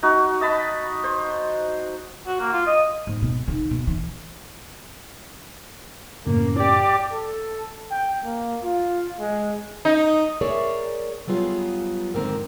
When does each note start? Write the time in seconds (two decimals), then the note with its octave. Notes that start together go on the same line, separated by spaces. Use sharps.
0.03 D#4 F#4
0.41 D#5 A5 B5
1.04 C5
2.26 F#4
2.40 A#3
2.53 F4
2.67 D#5
3.07 G#2
3.22 B2
3.48 D#3
3.71 B2
3.87 E3
6.26 F#2 A2 C#3 A#3
6.59 G4 D5
7.12 A4
7.91 G5
8.24 A#3
8.64 F4
9.20 G#3
9.85 D#4
10.41 G#4 A#4 C#5 D5 E5
11.27 F#3 G3 B3 F4 G#4
12.14 F2 G#2 D3 D#3 C4 A#4